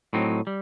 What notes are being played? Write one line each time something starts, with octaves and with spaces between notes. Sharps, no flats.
A2 F#3 C4 D#4
G3